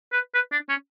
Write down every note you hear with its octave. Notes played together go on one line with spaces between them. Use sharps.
B4
B4
D4
C#4